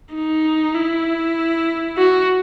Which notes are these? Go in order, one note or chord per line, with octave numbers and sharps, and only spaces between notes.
D#4
E4
F#4